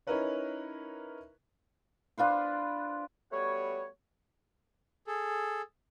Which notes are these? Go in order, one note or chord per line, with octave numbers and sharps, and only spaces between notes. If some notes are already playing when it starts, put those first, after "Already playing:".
C#4 D#4 E4 A#4 B4 C#5
D4 F4 B4 C5
G3 A3 B3 F#4 C#5
G#4 A4